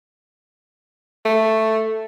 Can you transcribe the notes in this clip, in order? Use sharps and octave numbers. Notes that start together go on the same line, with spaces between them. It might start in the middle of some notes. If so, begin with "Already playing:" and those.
A3